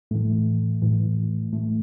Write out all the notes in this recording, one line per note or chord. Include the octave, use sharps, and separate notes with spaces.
A2 E3 A3
A2 E3
A2 E3 A3